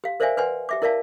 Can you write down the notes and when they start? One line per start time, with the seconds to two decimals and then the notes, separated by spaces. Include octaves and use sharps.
0.04 G4 F5
0.20 A#4 C5 D5 E5 F5 G#5
0.37 B4 D5 F#5 G#5 C6
0.69 G4 E5 D6
0.82 E4 A#4 D5 E5 F5 A5